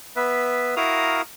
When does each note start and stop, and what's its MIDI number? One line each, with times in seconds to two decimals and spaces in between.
0.16 0.75 59
0.16 0.75 71
0.16 0.75 76
0.77 1.22 64
0.77 1.22 66
0.77 1.22 70
0.77 1.22 77
0.77 1.22 82
0.77 1.22 87